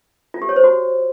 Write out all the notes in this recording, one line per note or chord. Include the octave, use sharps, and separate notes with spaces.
F4
G4
C#5
C5
F#4